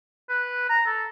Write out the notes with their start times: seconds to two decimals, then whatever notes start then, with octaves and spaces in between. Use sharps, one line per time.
0.29 B4
0.69 A#5
0.86 A4